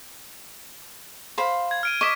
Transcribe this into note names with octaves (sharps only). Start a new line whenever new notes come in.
C5 F5 B5
G#6
F6 D7 D#7
D#5 C#6 D6 B6